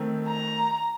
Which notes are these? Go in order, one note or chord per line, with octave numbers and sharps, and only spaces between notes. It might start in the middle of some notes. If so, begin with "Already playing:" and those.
Already playing: D#3 A3 C4
A#5